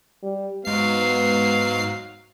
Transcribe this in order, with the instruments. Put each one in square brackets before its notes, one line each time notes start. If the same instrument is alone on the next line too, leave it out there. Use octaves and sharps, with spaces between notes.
[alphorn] G3
[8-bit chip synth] G#2 C7 [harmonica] F#3 F5 [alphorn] B3